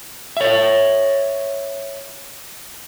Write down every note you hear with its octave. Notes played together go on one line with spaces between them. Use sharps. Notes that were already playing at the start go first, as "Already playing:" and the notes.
C#5 E5